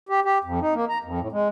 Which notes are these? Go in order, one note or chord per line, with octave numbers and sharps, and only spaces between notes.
G4
G4
F2
D#4
A#3
A#5
F2
A2
G#3